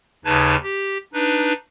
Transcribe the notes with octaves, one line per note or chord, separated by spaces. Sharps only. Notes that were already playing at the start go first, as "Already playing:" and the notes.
D#2 C#3 D#4 B4 A5 G#6
G4
D4 D#4 B4